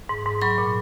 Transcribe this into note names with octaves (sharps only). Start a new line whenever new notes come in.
G#2
G#2
F#3 B5 C#6
A#2